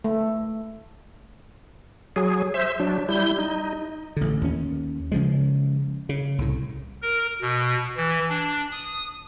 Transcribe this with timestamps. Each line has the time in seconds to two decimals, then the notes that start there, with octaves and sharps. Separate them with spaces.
0.04 A3
2.16 F#3 G#4
2.54 C5 E5
2.80 F#3 D4
3.09 G3 E4 G6
3.39 D#4
4.17 A1 D3
4.41 D#2 C#4
5.12 C#3 F3 G#3
6.09 C#3
6.38 C2 A2
7.02 A#4
7.42 B2
7.97 E3
8.29 D4
8.72 D#6